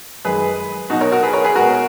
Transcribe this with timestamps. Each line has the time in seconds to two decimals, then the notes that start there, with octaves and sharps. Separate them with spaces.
0.25 F#2 D#3 G#3 G#4 B4
0.90 B2 F#3 D#4 F#4
1.01 A#4 C#5
1.12 F#4 A#4
1.23 G#4 B4
1.33 A#4 C#5
1.44 G#4 B4
1.55 B2 G#3 F#4 A#4